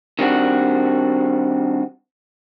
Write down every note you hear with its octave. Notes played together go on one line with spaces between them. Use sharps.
D#3 G3 B3 C4 D4 F#4